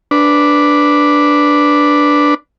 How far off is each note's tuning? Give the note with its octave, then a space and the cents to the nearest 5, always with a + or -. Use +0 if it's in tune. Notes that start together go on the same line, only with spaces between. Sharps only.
D4 +0 B4 +0